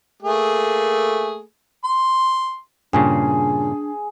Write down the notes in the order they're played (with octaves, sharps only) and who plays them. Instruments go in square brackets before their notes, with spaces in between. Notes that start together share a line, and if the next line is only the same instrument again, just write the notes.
[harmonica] A3 A#3 G#4
C6
[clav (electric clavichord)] G2 A#2 C#3 [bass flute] D4 [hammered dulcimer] G#4